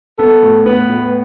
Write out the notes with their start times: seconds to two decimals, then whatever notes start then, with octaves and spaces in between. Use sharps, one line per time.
0.19 B3 A4
0.43 A2
0.66 B3 B4
0.89 A2